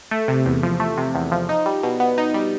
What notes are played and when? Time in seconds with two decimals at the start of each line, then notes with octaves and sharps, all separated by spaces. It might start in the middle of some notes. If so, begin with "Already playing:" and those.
0.11 A3
0.28 C3
0.46 E2
0.63 F3
0.80 A3
0.97 C3
1.14 E2
1.32 F3
1.49 D#4
1.66 G3
1.83 B2
2.00 B3
2.18 D#4
2.34 G3